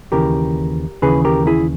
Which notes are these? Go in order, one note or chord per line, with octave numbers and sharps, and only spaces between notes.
D#2 C#3 E3 G4 A#4
D#2 C#3 E3 G#4 B4
G4 A#4
E4 G#4